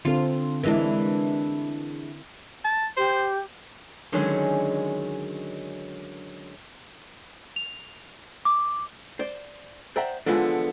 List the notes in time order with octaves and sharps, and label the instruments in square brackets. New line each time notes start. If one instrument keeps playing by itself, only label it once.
[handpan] D3 C4 A4 [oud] F4
[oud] E3 G#3 D4 [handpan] E4 A#4
[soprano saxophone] A5
[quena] G4 [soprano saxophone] C5
[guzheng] D3 D#3 F#3 G#3 C#4
[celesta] F7
D6
[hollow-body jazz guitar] C5 D5
C5 D5 E5 F#5 G5 A#5
D3 E3 F3 G#3 B3